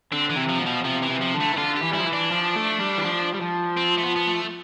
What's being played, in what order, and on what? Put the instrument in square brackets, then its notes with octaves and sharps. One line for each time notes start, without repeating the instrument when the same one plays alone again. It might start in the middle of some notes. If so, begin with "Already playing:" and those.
[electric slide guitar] D3 [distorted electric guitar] C4
[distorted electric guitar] E3
[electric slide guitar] C3
[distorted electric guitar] F3
[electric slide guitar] B2
[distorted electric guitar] F3
[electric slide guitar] C3 [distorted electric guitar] F3
[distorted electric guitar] E3
[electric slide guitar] C3
[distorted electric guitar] F3
[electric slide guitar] D3
[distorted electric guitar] A3
[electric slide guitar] E3
[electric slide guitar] D3 [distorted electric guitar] F4
[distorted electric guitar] G4
[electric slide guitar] E3
G3
[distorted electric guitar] E4
[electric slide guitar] F3
E3
[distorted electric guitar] D4
[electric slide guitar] F3
A3
G3
E3
F3
G3
F3
[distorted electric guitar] C4
A3
B3
B3
A3